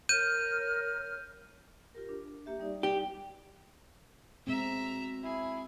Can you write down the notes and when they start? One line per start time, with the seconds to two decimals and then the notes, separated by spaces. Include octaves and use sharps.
0.09 A#4 C#5 F6 G6 D#7
1.95 F4 G4 A#4
2.09 D4
2.46 A#3 G4 E5
2.59 G3 D#4 D5
2.83 G4
4.47 B2 G#3 C4 E5 A#5
5.24 E4 G#4